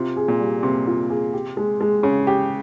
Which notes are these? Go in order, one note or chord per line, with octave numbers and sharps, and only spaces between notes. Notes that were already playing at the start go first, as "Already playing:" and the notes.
Already playing: C3 F4
G#4
A#2
G3
C3 A#3
F4
G#4
G4
G#3
G#3
C#3 C#4
G4